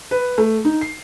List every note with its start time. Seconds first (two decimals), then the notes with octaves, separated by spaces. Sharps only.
0.11 B4
0.38 A3
0.65 D#4
0.81 C7